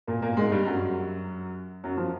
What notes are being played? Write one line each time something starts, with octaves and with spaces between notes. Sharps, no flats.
A#2 A#3
A#2 A#3
G#2 G#3
G2 G3
F#2 F#3
F#2 F#3
F3